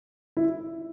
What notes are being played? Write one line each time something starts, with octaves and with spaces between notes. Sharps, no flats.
E4